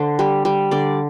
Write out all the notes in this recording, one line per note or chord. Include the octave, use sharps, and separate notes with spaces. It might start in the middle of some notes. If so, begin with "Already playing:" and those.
Already playing: D3 C5
G3
G3
D3 D5